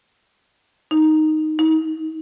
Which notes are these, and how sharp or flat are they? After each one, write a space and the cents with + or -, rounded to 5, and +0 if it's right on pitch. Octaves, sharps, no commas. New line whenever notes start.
D#4 +0
D#4 +35